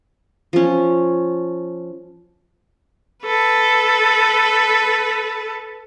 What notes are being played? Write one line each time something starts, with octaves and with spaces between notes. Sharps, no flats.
F3 C#4
A4 B4